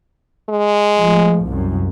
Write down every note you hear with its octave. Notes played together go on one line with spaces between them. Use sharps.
G#3
A2 F3
C2 F#2